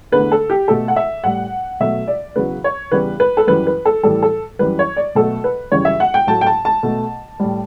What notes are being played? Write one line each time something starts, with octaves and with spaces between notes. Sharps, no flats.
E2 D3 A3 B4
A4
G4
B2 A3 A4
F#5
E5
A2 G3 F#5
B2 F#3 A3 E5
D5
E2 C#3 F#3 B4
C#5
E2 C#3 E3 G3 B4
B4
A4
F#2 E3 G3 B4
B4
A4
A2 E3 G3 A4
A4
F#2 E3 G3 B4
C#5
D5
B2 F#3 A3 A4
B4
F#2 C#3 E3 G3 C#5
E5
F#5
G5
A2 F#3 A3 A5
G5
A5
A5
B2 A3
A2 G3